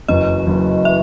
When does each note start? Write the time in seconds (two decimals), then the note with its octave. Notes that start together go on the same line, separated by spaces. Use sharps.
0.08 F#1 F#2 E3 D#5
0.47 F#1 F#2 E3
0.85 E3 E5